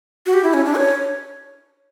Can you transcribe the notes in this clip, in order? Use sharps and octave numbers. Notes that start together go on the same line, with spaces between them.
F#4
G4
E4
C#4
D4
C#5